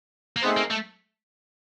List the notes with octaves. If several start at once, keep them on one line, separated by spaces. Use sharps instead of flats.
A#3
A3 B3 C4 D#4 G#4 C5
A#3
A3